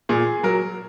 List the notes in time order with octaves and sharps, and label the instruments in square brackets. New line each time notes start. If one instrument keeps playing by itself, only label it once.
[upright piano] A#2 G#4
F#3 A#4